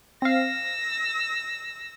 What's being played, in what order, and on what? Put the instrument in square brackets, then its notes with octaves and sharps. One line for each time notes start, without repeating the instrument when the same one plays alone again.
[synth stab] C4 F5 [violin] E6 A#6